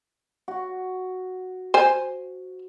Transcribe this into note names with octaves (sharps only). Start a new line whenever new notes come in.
F#4
C5 G#5